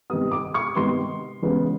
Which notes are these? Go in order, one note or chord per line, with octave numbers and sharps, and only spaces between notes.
C3 D#3 G3 B3 D#6
D6
C#6
C3 D#3 G3 B3 C6
C#3 E3 G#3 B3